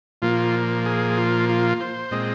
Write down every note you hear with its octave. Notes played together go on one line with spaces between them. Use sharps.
A#2 F3 A#3 F4
G#4
F4
F4
C5
A#2 G#3 C4 D#5